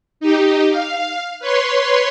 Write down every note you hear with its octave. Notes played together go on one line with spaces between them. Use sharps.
D#4 G4
F5
B4 C#5 C6